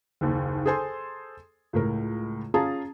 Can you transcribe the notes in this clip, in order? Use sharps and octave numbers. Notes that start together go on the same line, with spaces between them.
F#1 D#2
G#4 A4 C5 G#5 C6
C#2 A2 A#4
C#4 F4 G#4 A5 A#5